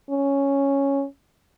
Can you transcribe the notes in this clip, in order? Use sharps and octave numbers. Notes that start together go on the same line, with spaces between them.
C#4